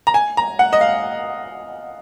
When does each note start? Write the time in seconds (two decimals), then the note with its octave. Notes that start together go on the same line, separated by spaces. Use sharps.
0.07 A#5
0.14 G#5
0.37 A#5
0.59 F#5
0.73 D#5
0.81 F5